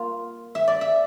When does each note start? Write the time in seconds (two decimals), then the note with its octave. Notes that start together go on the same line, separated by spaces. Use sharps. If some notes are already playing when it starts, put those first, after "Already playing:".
Already playing: A#3 F4
0.55 E5
0.68 D5
0.81 E5